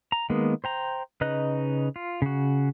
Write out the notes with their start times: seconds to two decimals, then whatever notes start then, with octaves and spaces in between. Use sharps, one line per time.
0.12 A#5
0.30 D#3 G#3 A#3 B3
0.64 C5 G5 A#5
1.21 C#3 D#4 B4 D#5 F#6
1.96 F4
2.22 C#3 F#4